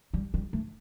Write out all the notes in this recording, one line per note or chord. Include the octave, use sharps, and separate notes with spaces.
G3
G3
A3